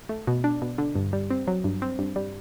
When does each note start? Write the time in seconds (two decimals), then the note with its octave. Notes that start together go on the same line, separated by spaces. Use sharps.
0.09 A3
0.27 B2
0.44 D4
0.62 B2
0.78 D3
0.95 G2
1.13 G3
1.31 C4
1.47 F#3
1.64 G2
1.82 C4
1.99 G2
2.16 G3